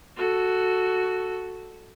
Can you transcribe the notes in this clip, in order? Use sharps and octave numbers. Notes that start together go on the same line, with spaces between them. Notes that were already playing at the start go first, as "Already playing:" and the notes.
F#4 A4